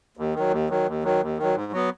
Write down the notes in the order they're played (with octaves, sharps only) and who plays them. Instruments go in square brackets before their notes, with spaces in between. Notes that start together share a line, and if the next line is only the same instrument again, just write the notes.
[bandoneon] D#2
D#3 F#3
D#2
D#3 F#3
D#2
D#3 F#3
D#2
D#3 F#3
G#2
F#3 B3